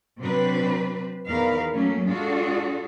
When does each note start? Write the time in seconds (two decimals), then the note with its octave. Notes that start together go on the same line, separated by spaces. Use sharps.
0.21 C3 F#3 C4 D4 B4 C5
1.29 E2 D#3 A#4 B4 F5
1.73 F#3 A3 A#3 C#4
2.09 G#3 D4 F4 F#4 G#4 A4